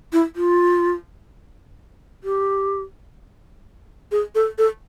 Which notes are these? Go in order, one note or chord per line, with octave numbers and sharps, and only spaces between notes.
E4
F4
G4
G#4
A4
A4